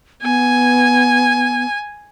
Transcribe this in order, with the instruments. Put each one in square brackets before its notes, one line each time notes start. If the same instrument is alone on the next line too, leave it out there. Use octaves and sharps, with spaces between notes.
[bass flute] B3 [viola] G#5